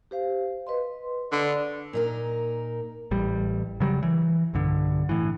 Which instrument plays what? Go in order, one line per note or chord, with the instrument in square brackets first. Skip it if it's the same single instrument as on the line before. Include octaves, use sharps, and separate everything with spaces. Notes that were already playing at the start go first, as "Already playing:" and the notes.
[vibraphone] G4 C5 F5
B4 D#5 C6
[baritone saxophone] D3 [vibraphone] D5
[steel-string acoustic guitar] A#2 D#4 A#4
[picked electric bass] A1 G3
C#3 F#3 G3
E3
B1 G2 D3
A2 E3